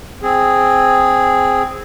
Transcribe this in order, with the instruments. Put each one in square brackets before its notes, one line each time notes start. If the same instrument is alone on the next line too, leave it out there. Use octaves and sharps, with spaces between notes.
[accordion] C4 G#4